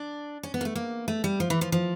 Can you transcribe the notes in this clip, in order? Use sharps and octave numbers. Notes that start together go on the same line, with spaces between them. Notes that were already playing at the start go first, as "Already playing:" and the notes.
Already playing: D4
C#4
B3
A#3
A3
A#3
A3
G3
F3
E3
F3
F3